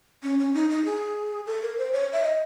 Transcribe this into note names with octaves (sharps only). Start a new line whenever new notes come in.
C#4
C#4
D#4
D#4
G#4
A4
A#4
C5
C#5
E5
D#5